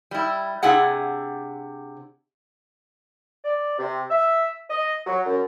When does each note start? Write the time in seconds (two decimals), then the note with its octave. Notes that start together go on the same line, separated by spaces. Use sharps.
0.11 G3 E4
0.63 C3 D4 E4 G#4 F#5
3.44 D5
3.79 C3
4.10 E5
4.70 D#5
5.06 F#3
5.25 F#2